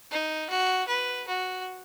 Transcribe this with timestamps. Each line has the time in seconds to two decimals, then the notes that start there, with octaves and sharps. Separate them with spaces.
0.11 D#4
0.50 F#4
0.88 B4
1.28 F#4